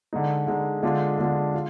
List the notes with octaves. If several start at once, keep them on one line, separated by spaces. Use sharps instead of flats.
D3 G#3 D#4
D3 G#3 D#4
D3 G#3 D4 F4
D3 G#3 D4 F4
F4